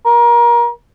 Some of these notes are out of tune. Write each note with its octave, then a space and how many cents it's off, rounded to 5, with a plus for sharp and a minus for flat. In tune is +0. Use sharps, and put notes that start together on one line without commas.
A#4 +30